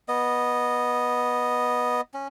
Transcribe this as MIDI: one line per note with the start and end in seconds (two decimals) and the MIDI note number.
0.08 2.01 59
0.08 2.01 75
2.14 2.27 61